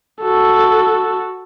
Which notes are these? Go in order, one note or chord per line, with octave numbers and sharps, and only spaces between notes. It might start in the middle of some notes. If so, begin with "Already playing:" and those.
F#4 A4